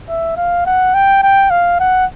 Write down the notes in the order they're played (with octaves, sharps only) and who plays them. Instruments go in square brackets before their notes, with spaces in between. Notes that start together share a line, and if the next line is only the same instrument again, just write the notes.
[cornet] E5
F5
F#5
G5
G5
F5
F#5